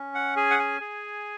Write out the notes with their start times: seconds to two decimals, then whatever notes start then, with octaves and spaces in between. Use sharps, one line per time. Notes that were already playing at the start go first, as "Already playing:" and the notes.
Already playing: C#4
0.15 F#5
0.36 G#4 G#5
0.50 F#5
0.59 G#5
0.81 G#4